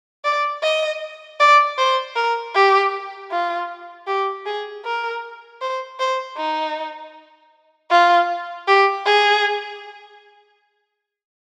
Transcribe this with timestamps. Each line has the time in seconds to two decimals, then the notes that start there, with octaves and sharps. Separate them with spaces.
0.24 D5
0.63 D#5
1.40 D5
1.78 C5
2.16 A#4
2.54 G4
3.31 F4
4.07 G4
4.46 G#4
4.84 A#4
5.61 C5
6.00 C5
6.37 D#4
7.90 F4
8.67 G4
9.06 G#4